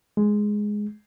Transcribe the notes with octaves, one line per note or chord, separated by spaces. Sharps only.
G#3